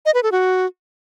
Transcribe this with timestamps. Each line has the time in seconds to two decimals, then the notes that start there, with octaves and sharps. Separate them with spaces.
0.06 D#5
0.14 B4
0.23 A4
0.32 F#4